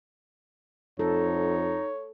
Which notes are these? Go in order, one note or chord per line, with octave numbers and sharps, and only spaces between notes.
F2 D#4 A4 C#5